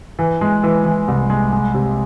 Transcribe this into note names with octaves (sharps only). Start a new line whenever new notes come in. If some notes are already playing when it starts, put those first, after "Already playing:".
E3
G#3
E3
E3
C2
G#3
G#3
C3